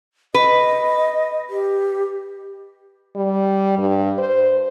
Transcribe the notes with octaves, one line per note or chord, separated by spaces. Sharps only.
B4 D#5
G4
G3
G2
C5